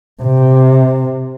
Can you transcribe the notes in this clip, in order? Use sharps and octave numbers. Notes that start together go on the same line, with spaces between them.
C3